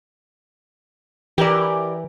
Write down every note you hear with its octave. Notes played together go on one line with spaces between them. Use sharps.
E3 G4 A#4 D5